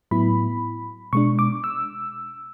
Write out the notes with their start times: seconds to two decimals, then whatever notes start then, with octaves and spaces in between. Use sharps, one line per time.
0.11 A2 F#3 B3 E4 B5
1.13 B2 G#3 D4 C#6
1.39 D6
1.64 E6